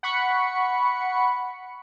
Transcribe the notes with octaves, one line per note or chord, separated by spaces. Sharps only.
F#5 B5 C#6 C#7